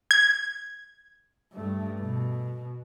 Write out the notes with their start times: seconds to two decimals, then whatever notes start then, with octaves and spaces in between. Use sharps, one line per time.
0.11 G#6
1.53 G2 A3
2.01 B2